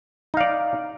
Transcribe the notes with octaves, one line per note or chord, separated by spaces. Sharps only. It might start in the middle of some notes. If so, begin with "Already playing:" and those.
D#4 D5 F5